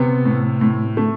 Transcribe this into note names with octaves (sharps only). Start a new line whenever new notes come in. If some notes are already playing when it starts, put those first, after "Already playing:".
Already playing: C3 B3
A2
A2
A3